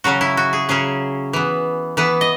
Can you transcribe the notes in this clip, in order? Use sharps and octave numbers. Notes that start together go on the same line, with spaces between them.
C#3 F#3 C#4 F#4
E4
F#4
G#4
C#3 F#3 C#4 G#4
E3 B3
E3 B3 B4
D#5